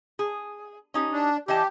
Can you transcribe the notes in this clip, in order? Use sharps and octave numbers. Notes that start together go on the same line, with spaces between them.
G#4
C#4 D#4 G4
D4
E3 G4 D#5 A5